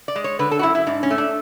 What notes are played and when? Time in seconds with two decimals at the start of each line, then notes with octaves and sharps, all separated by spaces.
0.08 D5
0.16 G#3
0.24 C#5
0.39 D3 B4
0.51 A4
0.59 F#4
0.63 F#2 E4
0.75 E4
0.87 G#2 D4
1.03 C#4
1.10 A3
1.18 D4